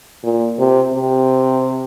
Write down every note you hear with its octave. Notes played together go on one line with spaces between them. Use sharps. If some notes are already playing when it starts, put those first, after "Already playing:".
A#2
C3
C3